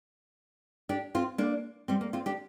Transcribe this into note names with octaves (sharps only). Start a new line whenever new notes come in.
D4 G4
C4 F4
A#3 D4
G3 C4
A#3
C4 F4
D4 G4